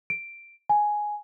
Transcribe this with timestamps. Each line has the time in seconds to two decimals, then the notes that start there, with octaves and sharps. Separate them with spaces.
0.10 D7
0.70 G#5